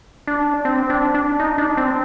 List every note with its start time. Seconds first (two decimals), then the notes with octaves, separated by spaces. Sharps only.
0.28 D4
0.65 C4
0.90 D4
1.15 D4
1.40 D#4
1.58 D4
1.77 C4